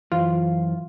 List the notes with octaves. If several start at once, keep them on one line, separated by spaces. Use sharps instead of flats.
F#2 E3 F4 C5